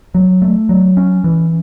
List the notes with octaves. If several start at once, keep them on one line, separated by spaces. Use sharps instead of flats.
F#3
A3
F#3
C#4
E3